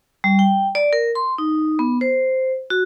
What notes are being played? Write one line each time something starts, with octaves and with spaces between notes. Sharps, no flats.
G3
G5
D5
A#4
C6
D#4
B3
C5
F#4